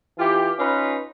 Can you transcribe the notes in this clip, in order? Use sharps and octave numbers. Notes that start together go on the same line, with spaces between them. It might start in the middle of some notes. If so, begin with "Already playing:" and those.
E3 F4 G4
C#4 D#4 F4 B4